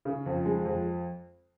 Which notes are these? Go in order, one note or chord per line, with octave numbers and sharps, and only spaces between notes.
C#3
F2
G#3
F2